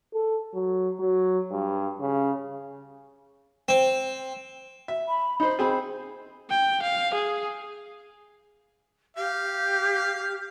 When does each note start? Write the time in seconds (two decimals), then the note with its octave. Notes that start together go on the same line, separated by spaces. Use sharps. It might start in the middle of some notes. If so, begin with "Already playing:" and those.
0.14 A4
0.54 F#3
0.99 F#3
1.51 G2
2.00 C#3
3.68 C4
4.88 E5
5.08 B5
5.40 D#4 C5 B5
5.59 C4 G#4
6.50 G5
6.82 F5
7.14 G#4
9.17 G4 F5